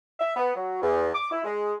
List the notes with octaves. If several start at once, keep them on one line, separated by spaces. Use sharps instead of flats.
E5
B3
F#3
E2
D6
E4
G#3